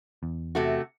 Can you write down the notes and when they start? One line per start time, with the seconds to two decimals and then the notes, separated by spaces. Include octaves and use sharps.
0.23 E2
0.55 C3 A3 F#4